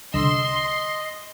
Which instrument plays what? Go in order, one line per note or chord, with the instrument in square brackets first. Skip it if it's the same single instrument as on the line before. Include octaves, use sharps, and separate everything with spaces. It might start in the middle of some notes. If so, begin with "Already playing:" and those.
[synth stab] C2 D3 E6 [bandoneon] D#5 [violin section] C6